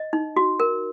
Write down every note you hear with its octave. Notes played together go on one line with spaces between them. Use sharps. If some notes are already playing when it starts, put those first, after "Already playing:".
Already playing: D#5
D#4
F#4
A#4